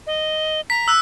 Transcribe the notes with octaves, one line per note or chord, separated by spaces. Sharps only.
D#5
A#5 B6
E6 F#6